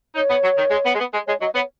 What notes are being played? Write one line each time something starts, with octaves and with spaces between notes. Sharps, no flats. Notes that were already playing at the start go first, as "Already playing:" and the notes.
D#4 C#5
B3
F#3
D#3
G#3
B3
G#3
B3
G#3
G#3 C#5
F#3 D#5
B3 C#5